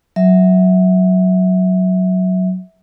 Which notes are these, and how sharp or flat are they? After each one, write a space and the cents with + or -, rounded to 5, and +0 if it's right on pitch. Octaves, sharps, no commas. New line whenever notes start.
F#3 +0 E5 -15